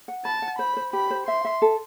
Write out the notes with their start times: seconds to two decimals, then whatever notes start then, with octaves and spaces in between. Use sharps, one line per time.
0.08 F#5
0.25 A5 B5
0.42 F#5
0.59 C5 B5
0.77 C5
0.93 G4 B5
1.11 C5
1.27 E5 C6
1.45 E5
1.62 A4